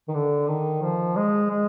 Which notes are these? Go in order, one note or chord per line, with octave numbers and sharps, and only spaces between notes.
D#3
D3
D#3
F3
G#3
G#3